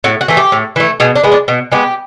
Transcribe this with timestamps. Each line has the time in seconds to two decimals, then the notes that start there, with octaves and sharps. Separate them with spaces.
0.04 A2 F#4
0.21 F#4
0.28 E3 A3
0.37 G4
0.52 A2
0.76 E3 A3
1.00 B2 G#4
1.16 D4
1.23 G#3 B3
1.32 D4
1.48 B2
1.72 G#3 B3 G4